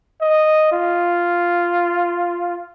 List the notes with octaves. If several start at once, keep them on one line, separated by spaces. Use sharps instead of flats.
D#5
F4